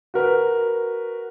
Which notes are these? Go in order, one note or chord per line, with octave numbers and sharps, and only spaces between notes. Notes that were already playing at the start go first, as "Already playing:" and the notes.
F#4 A#4 B4